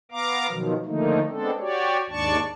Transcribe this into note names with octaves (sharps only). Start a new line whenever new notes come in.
B3 F5 A#5 D6
B2 D#3 F3 F#3
D3 D#3 F3 A3 A#3 D#4
G#3 B3 C4 D4 A4
F#4 G4 C#5 D5
D#2 G#2 D4 D5 A5 C#6